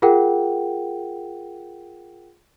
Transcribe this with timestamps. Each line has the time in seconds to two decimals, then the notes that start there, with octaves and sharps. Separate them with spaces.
0.02 F4 G#4 A#4 F#5 G5